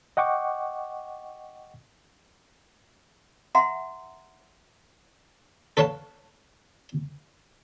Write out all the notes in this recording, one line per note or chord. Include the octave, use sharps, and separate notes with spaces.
D#5 F#5 G5 C#6 D6
E5 F#5 A#5 C6
A4 B4 C#5 F5 F#5 A5